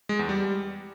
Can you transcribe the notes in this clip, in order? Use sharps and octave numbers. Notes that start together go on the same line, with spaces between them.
G#3
E2
G3